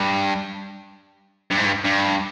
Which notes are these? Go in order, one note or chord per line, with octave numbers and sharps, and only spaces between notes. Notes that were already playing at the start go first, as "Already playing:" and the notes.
Already playing: G2
G2
G#2
G2
G2